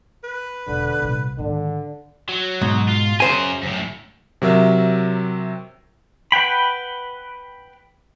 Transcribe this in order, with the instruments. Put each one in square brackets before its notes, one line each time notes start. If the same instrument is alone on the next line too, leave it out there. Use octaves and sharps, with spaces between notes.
[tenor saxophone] B4
[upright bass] E1 [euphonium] D3
[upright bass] C2 A#2
[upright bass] G#2 D#3 [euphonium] D3
[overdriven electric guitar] F#3
[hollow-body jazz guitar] G#2 B2
[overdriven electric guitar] F4
[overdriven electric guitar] F#2 A#4 [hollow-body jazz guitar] C#3 C5 G#5
[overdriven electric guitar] F#2 A2
[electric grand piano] C3 F#3 A#4 E5
[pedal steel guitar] B4 F#5 G5 B5